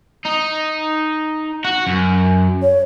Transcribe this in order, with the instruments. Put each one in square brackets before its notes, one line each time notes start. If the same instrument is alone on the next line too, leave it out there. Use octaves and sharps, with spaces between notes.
[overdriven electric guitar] D#4
F#4
F#2
[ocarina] C#5